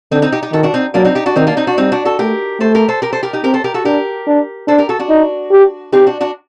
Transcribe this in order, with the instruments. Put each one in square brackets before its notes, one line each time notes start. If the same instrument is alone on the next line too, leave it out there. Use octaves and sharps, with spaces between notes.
[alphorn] D3 [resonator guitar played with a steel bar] C4 D#4
[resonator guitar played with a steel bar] C4 D#4
D#4 G4
D#4 G4
[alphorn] D#3 [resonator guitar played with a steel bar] F#4 A4
[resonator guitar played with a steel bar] D4 F#4
C4 D#4
[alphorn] F#3 [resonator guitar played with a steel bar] A#3 D4
[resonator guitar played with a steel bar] C4 D#4
D#4 G4
D4 F#4
[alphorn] D#3 [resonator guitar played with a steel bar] C4 D#4
[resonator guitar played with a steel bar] A#3 D4
C4 D#4
D4 F#4
[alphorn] G3 [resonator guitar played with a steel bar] C4 D#4
[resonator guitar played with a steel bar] D4 F#4
F#4 A4
[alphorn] A3 [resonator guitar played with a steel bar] G4 A#4
[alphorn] A3 [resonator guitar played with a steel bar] A4 C5
[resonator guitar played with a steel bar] G4 A#4
A4 C5
G4 A#4
A4 C5
G4 A#4
D#4 G4
[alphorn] C4 [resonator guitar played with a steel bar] G4 A#4
[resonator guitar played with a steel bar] A4 C5
G4 A#4
F#4 A4
[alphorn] D4 [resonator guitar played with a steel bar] G4 A#4
[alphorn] D4
[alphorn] D4 [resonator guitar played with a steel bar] A4 C5
[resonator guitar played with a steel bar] G4 A#4
F#4 A4
D4 F#4
[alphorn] D#4
G4
[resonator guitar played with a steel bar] C4 D#4 [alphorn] G4
[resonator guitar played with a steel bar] D4 F#4
D4 F#4